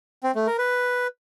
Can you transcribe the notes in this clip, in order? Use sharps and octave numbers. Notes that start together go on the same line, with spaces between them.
C4
A3
A#4
B4